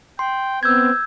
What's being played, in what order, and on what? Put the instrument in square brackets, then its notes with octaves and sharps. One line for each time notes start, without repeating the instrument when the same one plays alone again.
[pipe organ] G5 [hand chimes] C6
[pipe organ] B3 C4 [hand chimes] E6 G6 G#6